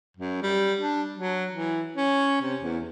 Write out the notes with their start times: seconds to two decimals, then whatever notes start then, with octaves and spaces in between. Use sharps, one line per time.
0.17 F#2
0.43 G3
0.79 D4
1.17 F#3
1.51 E3
1.97 C#4
2.42 C3
2.61 E2